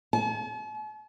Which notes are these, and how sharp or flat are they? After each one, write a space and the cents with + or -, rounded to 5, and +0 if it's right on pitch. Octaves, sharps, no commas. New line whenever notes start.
A5 -45